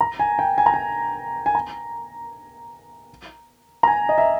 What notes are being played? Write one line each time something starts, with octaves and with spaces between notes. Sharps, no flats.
A#5
G#5
G5
G#5
A#5
G#5
G#5
A#5
A#5
G#5
D#5
E5